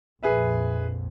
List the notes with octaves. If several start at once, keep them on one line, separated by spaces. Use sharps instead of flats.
A#1 F2 G#4 B4 E5